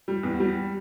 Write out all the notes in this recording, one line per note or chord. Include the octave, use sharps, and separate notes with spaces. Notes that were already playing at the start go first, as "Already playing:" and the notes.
G3
E2
G3